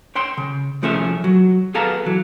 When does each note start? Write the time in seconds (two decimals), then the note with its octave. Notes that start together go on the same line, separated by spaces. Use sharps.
0.15 C#5 G5 C6
0.37 C#3
0.82 C2 F3 A3 C#4 G#4 E5
1.24 F#3
1.74 B3 G#4 A4 F5 A5 A#5
2.06 E3 F#3